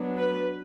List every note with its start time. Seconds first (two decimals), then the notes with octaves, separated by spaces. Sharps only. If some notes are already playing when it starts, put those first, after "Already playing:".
Already playing: F#3 B3 D4
0.17 B4